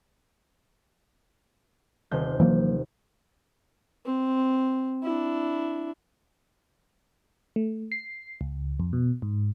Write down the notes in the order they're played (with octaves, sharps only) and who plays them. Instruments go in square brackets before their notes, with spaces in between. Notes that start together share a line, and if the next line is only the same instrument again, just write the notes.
[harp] D#1 C3 G6
[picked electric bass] E3 F#3 A#3
[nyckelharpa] C4
D4 E4
[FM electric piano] A3
C7
C#2
F2
B2
G#2